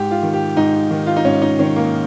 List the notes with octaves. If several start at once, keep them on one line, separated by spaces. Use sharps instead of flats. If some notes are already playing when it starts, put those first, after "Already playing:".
Already playing: G#2 G4
F4
D#3
G4
G#2 D#4
D#3
F4
D#4
G#2 C#4
D#4
D#3 C#4
A#3